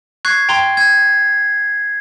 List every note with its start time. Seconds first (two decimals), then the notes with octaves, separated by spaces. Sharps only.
0.25 C#6 F#6 G#6 C7
0.49 G5 A#5 C6
0.77 G#6